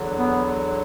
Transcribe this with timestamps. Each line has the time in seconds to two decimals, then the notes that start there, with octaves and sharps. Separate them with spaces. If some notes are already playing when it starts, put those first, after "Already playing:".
Already playing: E2 D3 F#3
0.17 B3